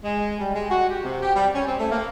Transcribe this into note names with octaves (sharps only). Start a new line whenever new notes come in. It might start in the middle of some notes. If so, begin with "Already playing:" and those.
G#3
G3
G#3
F#4
G4
C3
G4
G3
C#4
C4
A3
A#3